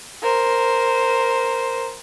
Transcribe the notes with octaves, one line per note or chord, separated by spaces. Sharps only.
A#4 C5